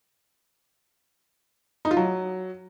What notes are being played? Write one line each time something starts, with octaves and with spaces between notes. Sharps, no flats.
D#4
F4
F#3